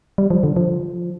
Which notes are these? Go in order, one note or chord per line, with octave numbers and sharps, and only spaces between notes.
G3
F3
D3
F3